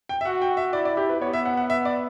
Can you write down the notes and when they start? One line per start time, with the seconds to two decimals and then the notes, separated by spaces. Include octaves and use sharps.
0.09 G5
0.21 E5
0.25 F#4 F#5
0.42 G5
0.57 E5
0.73 E4 D5
0.85 D5
0.97 G4
1.09 B4
1.21 B3 C#5
1.33 E5
1.45 F#5
1.57 F#5
1.70 E5
1.85 D5